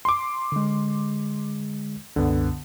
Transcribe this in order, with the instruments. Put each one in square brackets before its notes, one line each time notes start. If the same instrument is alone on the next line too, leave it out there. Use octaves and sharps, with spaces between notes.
[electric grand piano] C6 D6
[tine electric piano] D3 G#3
[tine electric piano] C2 F#2 [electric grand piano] D3 B3